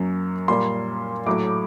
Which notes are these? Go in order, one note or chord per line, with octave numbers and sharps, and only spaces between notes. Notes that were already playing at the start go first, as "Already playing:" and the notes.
Already playing: F#2 F#3 A#3
A#2 G3 A#3 C6
A2 F#3 A3 D6